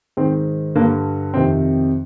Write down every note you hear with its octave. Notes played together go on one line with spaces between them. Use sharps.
G#2 D#3 C4
G2 D3 A#3
F2 C3 D#3 C4